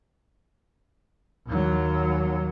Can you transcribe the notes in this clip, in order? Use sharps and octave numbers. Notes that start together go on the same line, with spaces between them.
D#2 F#3